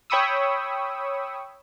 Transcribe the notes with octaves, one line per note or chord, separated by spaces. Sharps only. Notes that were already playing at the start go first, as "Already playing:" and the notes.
C#5 G5 B5 C#6 D#6 E6